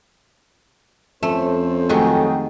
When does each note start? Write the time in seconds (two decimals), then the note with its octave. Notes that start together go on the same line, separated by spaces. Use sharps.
1.23 F2 A3 C#4 A4 C5
1.89 D#3 F#3 G#3 A3 D#4 F#4 G4